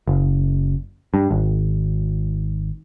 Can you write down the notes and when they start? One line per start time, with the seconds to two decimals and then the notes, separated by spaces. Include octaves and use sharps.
0.07 F#1
1.14 G2
1.31 G#1